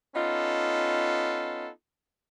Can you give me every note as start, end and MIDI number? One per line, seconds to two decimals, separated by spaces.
0.16 1.69 59
0.16 1.69 61
0.16 1.69 63
0.16 1.69 65
0.16 1.69 69